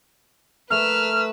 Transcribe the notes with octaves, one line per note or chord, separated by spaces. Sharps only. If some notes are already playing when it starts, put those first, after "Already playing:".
A3 A#4 B4 E6 F6